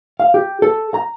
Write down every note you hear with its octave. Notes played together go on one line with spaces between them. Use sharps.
F5
G4
A4
A#5